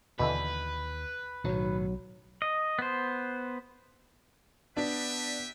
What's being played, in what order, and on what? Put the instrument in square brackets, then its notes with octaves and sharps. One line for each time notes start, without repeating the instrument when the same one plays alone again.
[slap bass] D#2 [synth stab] B2 D3 E3 [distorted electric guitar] B4
[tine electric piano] B1 F#3 [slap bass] A2 D#3
[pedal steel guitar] D#5
B3 C5
[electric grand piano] B3 [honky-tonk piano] D4 [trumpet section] G4 B4 E5